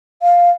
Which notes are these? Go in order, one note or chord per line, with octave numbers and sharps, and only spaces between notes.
F5